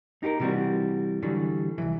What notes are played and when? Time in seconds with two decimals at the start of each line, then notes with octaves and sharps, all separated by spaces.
0.23 D#4 G4 G#4 A#4
0.40 C3 E3 G3 C4 F#4
1.22 D3 E3 F#3 G3
1.78 C2 F#2 E3